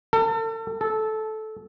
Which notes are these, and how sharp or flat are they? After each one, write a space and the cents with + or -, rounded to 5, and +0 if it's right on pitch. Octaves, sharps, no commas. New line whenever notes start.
A4 +40
A4 -15